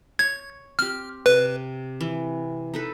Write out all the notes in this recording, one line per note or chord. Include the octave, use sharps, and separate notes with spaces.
C#5 G#6
C4 G4 F6
C3 B4
E3
D#4 A4 B4